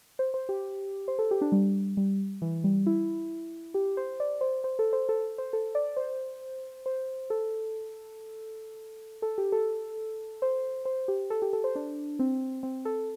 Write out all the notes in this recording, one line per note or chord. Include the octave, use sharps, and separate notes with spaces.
C5
C5
G4
C5
A4
G4
D4
G3
G3
E3
G3
E4
G4
C5
D5
C5
C5
A4
C5
A4
C5
A4
D5
C5
C5
A4
A4
G4
A4
C5
C5
G4
A4
G4
A4
C5
D4
C4
C4
A4